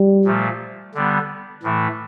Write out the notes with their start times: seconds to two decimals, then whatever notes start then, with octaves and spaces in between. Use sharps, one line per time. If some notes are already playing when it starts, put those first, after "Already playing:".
Already playing: G3
0.25 A#2 F3 A3
0.94 D3 G3 B3
1.63 A2 E3 A3